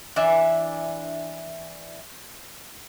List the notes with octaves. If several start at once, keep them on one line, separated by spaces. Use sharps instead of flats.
E3 D4 E5